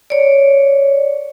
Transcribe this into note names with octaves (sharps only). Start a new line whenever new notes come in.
C#5 D5